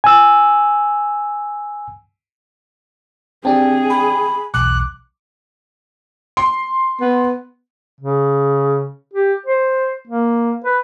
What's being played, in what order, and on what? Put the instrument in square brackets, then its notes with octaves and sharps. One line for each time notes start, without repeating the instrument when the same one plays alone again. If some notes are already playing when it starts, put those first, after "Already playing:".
[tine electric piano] G#5 E6
[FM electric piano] C4 D4 G4 [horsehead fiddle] G#4 [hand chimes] G5 A5
[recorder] B5
[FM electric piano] B1 E2 [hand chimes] D6 [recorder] F#6
[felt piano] C6
[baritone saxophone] B3
[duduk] C#3
G4
C5
A#3
B4